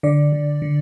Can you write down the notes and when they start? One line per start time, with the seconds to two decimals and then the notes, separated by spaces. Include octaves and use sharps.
0.03 D3 D5
0.32 D3
0.62 D3